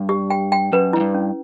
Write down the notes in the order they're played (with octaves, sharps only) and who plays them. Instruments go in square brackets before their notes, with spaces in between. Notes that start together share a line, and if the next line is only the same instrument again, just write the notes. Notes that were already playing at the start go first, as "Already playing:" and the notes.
Already playing: [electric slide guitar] G2
[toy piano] G4
G5
G5
[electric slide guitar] F#2 [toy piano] B4
[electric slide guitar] F#2 [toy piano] E4
[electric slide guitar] G2
[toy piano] C#4